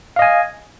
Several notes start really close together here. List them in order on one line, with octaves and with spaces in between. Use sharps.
F5 D#5 G#5